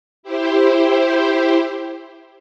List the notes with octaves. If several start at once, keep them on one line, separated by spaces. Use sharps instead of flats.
E4 G4 C5